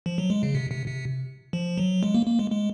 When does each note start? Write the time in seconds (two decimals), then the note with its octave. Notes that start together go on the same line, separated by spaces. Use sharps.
0.06 F3
0.18 F#3
0.30 G#3
0.43 C#3
0.55 C3
0.71 C3
0.88 C3
1.53 F3
1.78 F#3
2.03 G#3
2.14 A#3
2.27 A#3
2.39 G#3
2.52 G#3